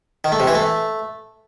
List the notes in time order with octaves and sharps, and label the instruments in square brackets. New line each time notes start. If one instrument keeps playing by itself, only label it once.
[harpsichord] D#3
A3
C3
E3
A3